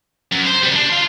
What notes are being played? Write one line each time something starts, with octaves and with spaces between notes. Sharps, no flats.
F#2
C5
C#3 G3
D4
F5 C6